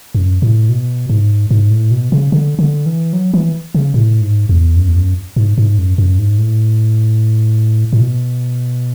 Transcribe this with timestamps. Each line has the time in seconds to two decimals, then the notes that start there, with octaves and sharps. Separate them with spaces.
0.15 F#2
0.42 A2
0.69 B2
1.09 G#2
1.51 G#2
1.70 A2
1.91 B2
2.12 C#3
2.32 D3
2.59 D3
2.86 E3
3.13 F#3
3.34 E3
3.75 C#3
3.94 A2
4.21 G#2
4.49 E2
4.76 F#2
4.88 E2
4.96 F#2
5.36 G#2
5.58 G#2
5.78 F#2
5.98 F#2
6.19 G#2
6.38 A2
7.93 A2
8.01 B2